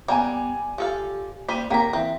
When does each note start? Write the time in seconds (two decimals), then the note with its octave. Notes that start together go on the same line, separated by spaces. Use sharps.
0.08 G3 A#3 B3 D5 F#5 G#5
0.78 F3 G4 A4 F5
1.49 G3 A#3 C5 B6 D#7
1.70 D#2 A#3 G4 A#4 A#5 B6
1.93 E3 C4 E5